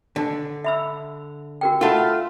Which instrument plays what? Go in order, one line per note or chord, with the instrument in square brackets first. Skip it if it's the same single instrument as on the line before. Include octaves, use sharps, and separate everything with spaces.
[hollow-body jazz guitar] D3
[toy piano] E5 B5 E6
F#4 A#4 G5
[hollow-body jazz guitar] A3 F4 [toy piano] A#4 F#5 B5